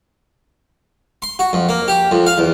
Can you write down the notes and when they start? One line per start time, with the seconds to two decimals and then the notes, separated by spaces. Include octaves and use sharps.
1.22 C6
1.39 F#4
1.53 F2
1.69 A#3
1.88 G4
2.11 F2
2.26 F5
2.38 E2